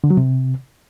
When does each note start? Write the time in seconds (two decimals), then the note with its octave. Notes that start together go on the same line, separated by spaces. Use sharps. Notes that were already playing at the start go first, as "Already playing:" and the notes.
0.04 D3
0.10 F#3
0.17 C3